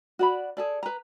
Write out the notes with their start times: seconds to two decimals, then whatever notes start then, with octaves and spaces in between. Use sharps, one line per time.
0.19 F#4 D5 B5
0.57 G#4 A4 D5
0.83 B4 A#5